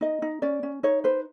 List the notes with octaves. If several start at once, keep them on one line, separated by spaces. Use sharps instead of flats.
D#4 D#5
D#4
C#4 D5
C#4
D#4 C#5
B4 C5